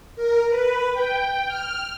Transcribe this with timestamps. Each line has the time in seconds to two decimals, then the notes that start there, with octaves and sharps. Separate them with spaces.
0.16 A#4
0.49 B4
0.93 G5
1.47 F6